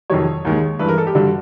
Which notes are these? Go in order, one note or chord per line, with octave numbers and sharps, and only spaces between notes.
F2 C3 D#3 F#3 C#5
D#2 D#3 G#3
G2 E3 G#3 B4
A#4
A4
G4
G2 D3 G3 F#4